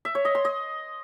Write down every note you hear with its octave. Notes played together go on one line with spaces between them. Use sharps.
E5
C#5
D#5
C6
D#5